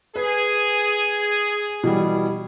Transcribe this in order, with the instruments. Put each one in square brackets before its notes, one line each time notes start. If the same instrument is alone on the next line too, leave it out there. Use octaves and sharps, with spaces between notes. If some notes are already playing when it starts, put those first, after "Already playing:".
[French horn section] G#4 [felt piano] B4
[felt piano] B2 E3 G3